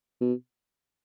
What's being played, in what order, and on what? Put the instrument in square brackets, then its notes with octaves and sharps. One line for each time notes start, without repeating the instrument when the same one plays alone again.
[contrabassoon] B2